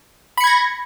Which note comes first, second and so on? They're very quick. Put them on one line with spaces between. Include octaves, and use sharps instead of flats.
B5 C#7 G#6 A#6